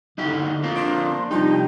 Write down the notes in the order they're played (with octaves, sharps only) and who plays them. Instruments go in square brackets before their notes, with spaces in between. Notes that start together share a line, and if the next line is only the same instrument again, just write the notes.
[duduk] D3 [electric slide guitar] D#4 E4 G4
[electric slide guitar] A#3 C4 F4
[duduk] D4 [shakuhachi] C6 [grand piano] D7
[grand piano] C3 F3 G3 [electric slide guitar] D#4 [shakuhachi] G5